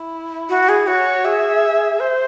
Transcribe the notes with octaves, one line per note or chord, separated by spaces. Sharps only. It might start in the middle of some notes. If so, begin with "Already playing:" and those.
Already playing: E4
F#4
G#4
F#4 C#5
G#4 E5
C5